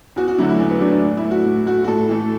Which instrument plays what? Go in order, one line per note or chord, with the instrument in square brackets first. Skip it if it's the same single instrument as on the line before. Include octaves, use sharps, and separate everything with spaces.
[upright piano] E2 F#4
F#4
D3 F#3 A3 E4
E4
E2
B3
D3 F#3 A3 D4
D4
A2
E4
A3
F#4
A2
A3 F#4
F#4
A2 A4
E3 A3